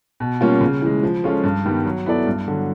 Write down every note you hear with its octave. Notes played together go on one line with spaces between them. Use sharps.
B2
G3 A#3 C#4 F4
C#3
E3 G#3
F3
G#3 C#4 F4 A4
G2
D#3 G3 B3
F#3
B3 E4 A4 D5
G2
D3 F#3